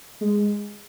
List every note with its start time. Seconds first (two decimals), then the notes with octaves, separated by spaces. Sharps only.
0.21 G#3